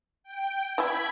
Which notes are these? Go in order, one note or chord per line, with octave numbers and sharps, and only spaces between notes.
G5
E3 E4 B5 G#6 B6